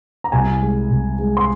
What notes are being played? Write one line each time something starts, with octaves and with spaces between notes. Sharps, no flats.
A#5
C2 G#5
G#3
C2
G#3
C6